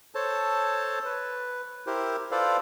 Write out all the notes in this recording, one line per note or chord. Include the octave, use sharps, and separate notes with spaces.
A4 C5 C#5 A5
B4
E4 G4 A#4 C5
F4 A4 B4 C5 D5 F5